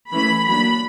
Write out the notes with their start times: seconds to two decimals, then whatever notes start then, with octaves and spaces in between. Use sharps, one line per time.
0.14 E3 A3 C#4 B5
0.47 F#3 A#3 D4 B5